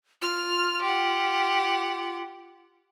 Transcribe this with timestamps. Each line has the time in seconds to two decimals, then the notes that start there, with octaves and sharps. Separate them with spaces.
0.22 F4 F6
0.82 G4 F#5